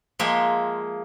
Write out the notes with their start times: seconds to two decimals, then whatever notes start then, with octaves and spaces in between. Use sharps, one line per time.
0.19 F3 G#3 A#3 E5 G5